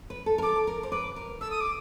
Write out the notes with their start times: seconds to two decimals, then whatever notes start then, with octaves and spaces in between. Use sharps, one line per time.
0.10 B4
0.26 A4
0.38 A#4
0.42 A4 D6
0.67 A#4
0.83 C5
0.92 B4 D6
1.16 A#4
1.41 A4 E6
1.51 D#6
1.60 D6